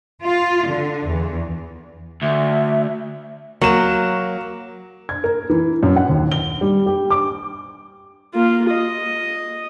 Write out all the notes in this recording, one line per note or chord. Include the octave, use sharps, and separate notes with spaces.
F4
D3
E2
D2 E5
F#3 A#3 E7
G#6
A#4
E3
F#2
F#5
D#2
G7
G3
G4
D6
A#3 F4
D#5